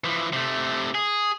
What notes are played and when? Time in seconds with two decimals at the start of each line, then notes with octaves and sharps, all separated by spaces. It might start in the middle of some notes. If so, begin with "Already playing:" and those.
0.04 E3 F3
0.33 C3 A3
0.95 G#4